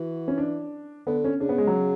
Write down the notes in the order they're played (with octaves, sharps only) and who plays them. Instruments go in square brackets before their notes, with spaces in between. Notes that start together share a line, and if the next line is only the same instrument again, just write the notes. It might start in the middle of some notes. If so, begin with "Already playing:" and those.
Already playing: [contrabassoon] E3 [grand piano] F#4
[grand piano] C#4
D4
[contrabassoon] D3 [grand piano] B3
[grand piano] C#4
[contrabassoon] C#3 [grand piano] D4
[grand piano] B3
G#3
F#3